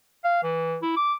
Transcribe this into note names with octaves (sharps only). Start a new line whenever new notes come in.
F5
E3
E4
D6